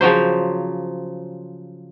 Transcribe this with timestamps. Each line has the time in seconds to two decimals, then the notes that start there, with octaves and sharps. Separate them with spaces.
0.01 C#3 F3 F#3 C5